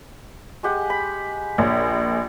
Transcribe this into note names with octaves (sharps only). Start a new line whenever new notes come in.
G#3 G4 F#5
B5
A#1 C#5